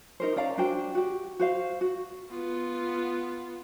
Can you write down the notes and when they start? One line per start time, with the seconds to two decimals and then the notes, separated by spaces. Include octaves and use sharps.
0.20 D#4 A#4 C5
0.36 C#4 D5 F5 A#5
0.58 D4 F#4 C5 G5
0.95 F#4 G4
1.39 F#4 C5 F5
1.81 F#4
2.30 B3 F4